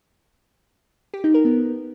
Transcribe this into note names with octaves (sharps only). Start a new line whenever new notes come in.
G4
D#4
A#4
B3